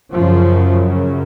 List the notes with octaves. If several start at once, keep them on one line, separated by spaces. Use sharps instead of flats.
F#2 C#3 F3